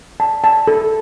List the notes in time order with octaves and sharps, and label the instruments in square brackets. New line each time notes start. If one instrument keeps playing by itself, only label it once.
[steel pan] A5
A5
A4